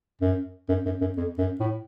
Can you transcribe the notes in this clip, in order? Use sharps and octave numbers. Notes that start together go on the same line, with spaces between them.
F#2
F#2
F#2
F#2
F2
F#2
A2